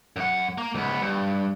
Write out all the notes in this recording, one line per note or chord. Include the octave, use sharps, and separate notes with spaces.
F#2 F#5
A#3
C#2 B3
G2